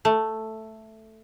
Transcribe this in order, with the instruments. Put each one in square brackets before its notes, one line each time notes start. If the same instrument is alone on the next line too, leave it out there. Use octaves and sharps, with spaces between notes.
[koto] A3